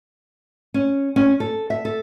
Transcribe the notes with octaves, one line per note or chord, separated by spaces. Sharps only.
C#4
C#4
A4
E5
A4